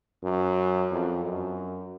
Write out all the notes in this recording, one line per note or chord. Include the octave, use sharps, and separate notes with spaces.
F#2
F2
F#2